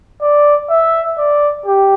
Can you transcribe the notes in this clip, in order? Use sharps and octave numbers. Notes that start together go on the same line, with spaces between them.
D5
E5
D5
G4